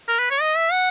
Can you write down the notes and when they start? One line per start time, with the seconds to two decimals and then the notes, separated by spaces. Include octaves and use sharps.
0.08 A#4
0.19 B4
0.30 C#5
0.41 D#5
0.57 E5
0.72 F#5